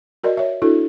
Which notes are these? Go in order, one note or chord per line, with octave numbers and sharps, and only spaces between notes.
F#4 A#4 D5 D#5
C#5 E5
D4 E4 F#4 A4